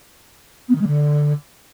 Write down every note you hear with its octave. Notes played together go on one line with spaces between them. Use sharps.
B3
D#3
G#3
D3